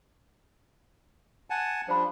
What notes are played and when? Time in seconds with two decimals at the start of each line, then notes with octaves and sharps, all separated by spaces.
1.50 F#5 G#5 A5
1.88 F3 G3 D4 C5 B5